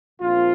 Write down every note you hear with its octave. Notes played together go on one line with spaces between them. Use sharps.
A#1 A#2 F3 C4 F4